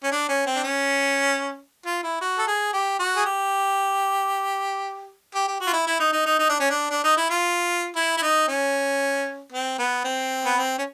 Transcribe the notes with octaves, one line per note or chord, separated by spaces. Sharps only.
C#4
D4
C#4
C4
D4
C#4
F4
E4
F#4
A4
G#4
G4
F#4
G#4
G4
G4
G4
F#4
F4
E4
E4
D#4
D#4
D#4
D#4
D4
C#4
D4
D4
D#4
E4
F4
E4
E4
D#4
C#4
C4
B3
C4
B3
C4
C#4